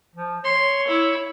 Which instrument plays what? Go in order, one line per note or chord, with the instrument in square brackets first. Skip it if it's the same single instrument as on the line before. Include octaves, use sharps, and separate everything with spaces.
[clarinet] F3
[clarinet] C#5 [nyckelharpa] C6
[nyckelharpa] E4